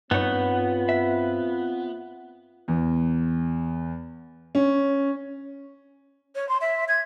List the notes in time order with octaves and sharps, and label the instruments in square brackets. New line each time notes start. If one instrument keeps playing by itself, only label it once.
[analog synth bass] G2 [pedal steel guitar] B3 [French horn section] C4 F4 [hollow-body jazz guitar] D#4 C#5
[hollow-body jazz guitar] E5
[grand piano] E2
C#4
[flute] C#5
C6
E5
G#6